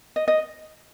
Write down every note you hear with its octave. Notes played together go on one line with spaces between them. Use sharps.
D#5
D#5